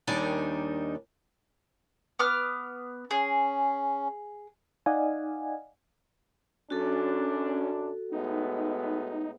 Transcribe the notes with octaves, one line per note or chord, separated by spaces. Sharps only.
D#2 D#3 G3 D4 D#4 G#5
B3 D6 F6
C#4 G#4
D#4 D5 D#5 F5 F#5 G#5
F#2 C#4 D4 F#4 A4
A2 G#3 B3 D#4